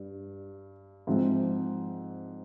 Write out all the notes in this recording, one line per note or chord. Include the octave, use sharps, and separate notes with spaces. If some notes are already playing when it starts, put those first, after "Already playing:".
Already playing: G2
G#2 F3 C4